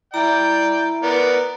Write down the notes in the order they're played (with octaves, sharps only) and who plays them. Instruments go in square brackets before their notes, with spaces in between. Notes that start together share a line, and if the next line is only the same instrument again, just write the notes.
[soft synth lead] E4 [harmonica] D5 G5 [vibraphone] A#5
[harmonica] B3 A#4 D5